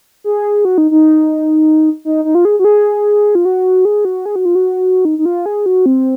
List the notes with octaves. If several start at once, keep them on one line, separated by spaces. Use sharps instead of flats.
G#4
F#4
D#4
D#4
D#4
D#4
F4
G#4
F#4
G#4
F4
F#4
G#4
F#4
G#4
F#4
F4
F#4
D#4
D#4
F4
G#4
F#4
C4